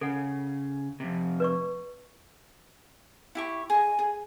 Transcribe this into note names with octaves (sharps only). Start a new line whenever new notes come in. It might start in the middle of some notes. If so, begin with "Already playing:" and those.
C#3 A4 F#5
F2 C3
B4 D5 C#6
E4 G4 C#6
G#4 D#5 G#5
G#4